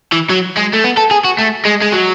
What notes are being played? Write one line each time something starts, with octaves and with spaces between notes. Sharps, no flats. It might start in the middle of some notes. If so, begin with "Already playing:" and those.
E3
F#3
G#3
A3
B3
A4
G#4
F#4
A3
G#3
G#3
F#3